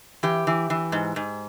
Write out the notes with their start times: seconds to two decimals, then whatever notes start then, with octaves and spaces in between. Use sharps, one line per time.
0.23 E3 G4
0.47 E3
0.70 E3
0.92 G#2
1.16 G#2